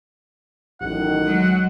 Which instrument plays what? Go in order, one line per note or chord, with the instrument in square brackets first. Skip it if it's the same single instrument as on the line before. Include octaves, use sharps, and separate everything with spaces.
[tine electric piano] A1 [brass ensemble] F#2 A2 D#3 [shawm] F#5
[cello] F#3 G#3